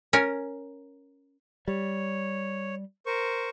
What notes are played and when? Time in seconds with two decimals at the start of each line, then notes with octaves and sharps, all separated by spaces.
0.13 C#4 A#4 C#5 G#5
1.68 G3 C#5
3.06 A#4 C5 C#6